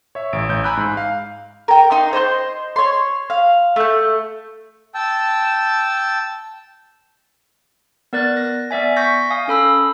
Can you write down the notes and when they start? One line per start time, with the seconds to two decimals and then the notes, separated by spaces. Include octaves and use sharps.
0.15 C#5 E5
0.33 A1 D7
0.49 A1 G6
0.64 G#5 A#5 B5 E6 F#6 G6
0.77 G#2
0.97 F5
1.68 A#4 G5
1.91 D#4 C6
2.13 C5 D#5 C6 G6
2.76 C#5 C6
3.30 F5
3.76 A3 G6
4.94 G5 A5 E6
8.13 B3 A#4 D5 F#6 A6
8.37 A#6
8.71 B3 D5 E5 G#5
8.97 C#6 G6 A#6 B6
9.30 F5 G#5 D#6
9.48 C#4 A4 B5 E6